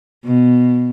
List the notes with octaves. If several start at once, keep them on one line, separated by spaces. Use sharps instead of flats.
B2